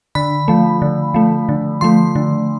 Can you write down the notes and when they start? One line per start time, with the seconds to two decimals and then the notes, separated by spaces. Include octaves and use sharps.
0.15 D3 B5
0.48 F3 A3
0.82 D3
1.14 F3 A3
1.49 D3
1.81 F3 A3 C6
2.15 D3